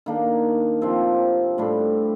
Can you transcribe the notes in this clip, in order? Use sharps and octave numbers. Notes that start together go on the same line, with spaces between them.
D#3 A#3 D4
C3 F3 C4
A2 G3 D4